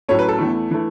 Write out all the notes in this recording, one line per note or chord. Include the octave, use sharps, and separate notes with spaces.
A2 F#3 A3 C#4 C#5
B4
A4
E2 E3 A3
E3 A3